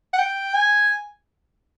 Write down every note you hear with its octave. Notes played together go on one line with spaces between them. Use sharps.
F#5
G5
G#5